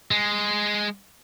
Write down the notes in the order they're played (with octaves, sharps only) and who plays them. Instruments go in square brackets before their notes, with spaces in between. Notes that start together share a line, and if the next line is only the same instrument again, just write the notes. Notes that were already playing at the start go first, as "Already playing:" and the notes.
[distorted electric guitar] G#3